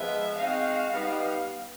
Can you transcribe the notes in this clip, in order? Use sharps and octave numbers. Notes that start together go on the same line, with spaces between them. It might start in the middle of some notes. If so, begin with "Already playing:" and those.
Already playing: F3 G#3 B3 E5
G#3 C4 D#4 F#4 F5
G3 B3 D#4